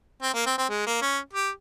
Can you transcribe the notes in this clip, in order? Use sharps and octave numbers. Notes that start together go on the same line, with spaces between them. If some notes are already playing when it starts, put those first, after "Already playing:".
C4
A#3
C4
C4
G#3
A#3
C#4
G4